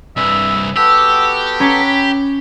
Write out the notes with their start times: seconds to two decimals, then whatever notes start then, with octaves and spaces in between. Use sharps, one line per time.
0.17 C2 G2 G#4 B4 E5
0.76 B3 F#4 G4 A4 E6
1.60 C#4 C#5 A#5 B5